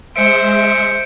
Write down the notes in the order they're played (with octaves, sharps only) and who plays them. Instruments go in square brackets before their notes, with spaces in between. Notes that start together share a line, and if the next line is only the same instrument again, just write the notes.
[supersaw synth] G#3 E5 [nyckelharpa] C5 [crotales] C#7 D7